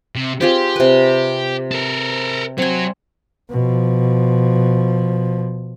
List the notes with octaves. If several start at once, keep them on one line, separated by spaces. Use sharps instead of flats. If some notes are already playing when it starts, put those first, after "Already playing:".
C3
C4 F4 G4 G#4
C3 B4
A4 A#4
F#3 C4 F#4 G#5
B2 F3